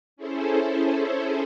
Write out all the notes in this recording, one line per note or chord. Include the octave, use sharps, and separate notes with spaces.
C#4 E4 G#4 A4 C5